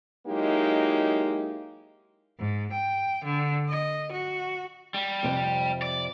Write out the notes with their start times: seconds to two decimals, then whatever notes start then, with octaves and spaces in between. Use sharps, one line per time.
0.27 F#3 G#3 A#3 D#4 E4 G4
2.39 G#2
2.72 G5
3.24 D3
3.69 D#5
4.12 F#4
4.94 G3
5.23 F2 C3 C5
5.82 D5